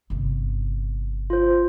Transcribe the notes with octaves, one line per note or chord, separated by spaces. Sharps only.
G1 C3
F4 C5